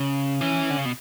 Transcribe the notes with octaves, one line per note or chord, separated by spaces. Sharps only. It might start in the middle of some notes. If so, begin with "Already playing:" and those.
Already playing: C#3
E3 C#4
D3
C#3
B2